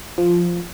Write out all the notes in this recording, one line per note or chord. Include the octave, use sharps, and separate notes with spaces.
F3